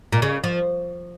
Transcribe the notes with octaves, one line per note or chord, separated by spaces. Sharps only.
A#2
C#3
F3